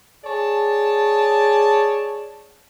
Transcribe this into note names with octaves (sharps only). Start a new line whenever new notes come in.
G#4 C#5 D5 A5